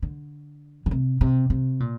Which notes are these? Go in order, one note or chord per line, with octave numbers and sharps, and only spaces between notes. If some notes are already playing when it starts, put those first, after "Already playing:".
D3
D3
C3
C3
C3
A#2